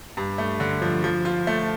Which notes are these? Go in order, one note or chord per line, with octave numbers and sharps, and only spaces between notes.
G2
A3
D3
F3
F3
F4
A3